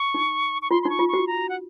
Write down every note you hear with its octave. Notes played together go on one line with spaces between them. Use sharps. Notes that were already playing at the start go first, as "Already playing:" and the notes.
Already playing: C#6
D#4
C#6
F4 C6
C6
D#4 C#6
F4
C#6
F#4
A#5
F#5